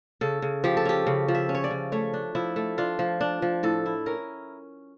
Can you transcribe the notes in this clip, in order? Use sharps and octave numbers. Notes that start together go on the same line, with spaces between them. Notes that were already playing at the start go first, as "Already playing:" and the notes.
C#3 A4
C#3
F3 G4
A4
C#4 G4
C#3
F3
E5
C#4
C#5
D5
C#3
A3 C#5
D4
F3 E4
A3
D4 F4
F3
D4
F3
A2 A4
E4
C#4 A#4